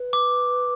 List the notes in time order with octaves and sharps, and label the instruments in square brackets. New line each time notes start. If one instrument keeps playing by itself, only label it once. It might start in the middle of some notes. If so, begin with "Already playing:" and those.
Already playing: [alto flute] B4
[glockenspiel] D6